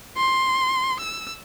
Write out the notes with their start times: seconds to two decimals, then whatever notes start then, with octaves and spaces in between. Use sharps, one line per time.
0.18 C6
1.00 E6